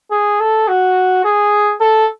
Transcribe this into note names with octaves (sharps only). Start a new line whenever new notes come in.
G#4
A4
F#4
G#4
A4